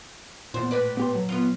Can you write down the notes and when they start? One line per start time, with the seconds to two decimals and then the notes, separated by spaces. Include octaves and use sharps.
0.54 E2 A#2 C5
0.71 A2 B4 D5
0.97 B3 G4 C6
1.15 F#3
1.29 B3 F4